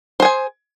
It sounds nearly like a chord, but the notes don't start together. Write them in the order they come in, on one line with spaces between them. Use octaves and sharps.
C5 G#4 G#5